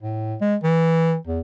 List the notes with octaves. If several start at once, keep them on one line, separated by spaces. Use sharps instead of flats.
A2
G#3
E3
E2